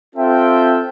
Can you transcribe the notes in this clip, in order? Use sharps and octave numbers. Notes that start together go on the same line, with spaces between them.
C4 F4 A4 E5 G5